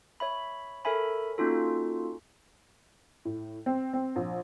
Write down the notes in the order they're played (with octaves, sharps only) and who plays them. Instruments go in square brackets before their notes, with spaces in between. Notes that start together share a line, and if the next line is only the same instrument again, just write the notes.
[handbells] C#5 E5 B5
A4 A#4 C#5 E5 G#5 B5
A#3 C#4 D#4 F4 F#4 A4
[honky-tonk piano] A2
C4
C4
A#1